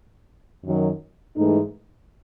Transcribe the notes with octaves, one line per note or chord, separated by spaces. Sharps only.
F#2 D#3 F#3
G#2 E3 A3 D#4